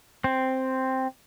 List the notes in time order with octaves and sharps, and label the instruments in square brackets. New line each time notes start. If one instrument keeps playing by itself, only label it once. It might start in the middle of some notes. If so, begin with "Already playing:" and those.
[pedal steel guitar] C4